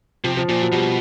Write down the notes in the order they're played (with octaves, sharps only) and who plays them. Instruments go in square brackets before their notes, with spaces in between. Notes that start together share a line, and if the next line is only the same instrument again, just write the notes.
[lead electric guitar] C3 [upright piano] F3
[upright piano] F3
[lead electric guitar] A#2 [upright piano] F3
[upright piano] F#3
[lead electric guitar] B2 [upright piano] G3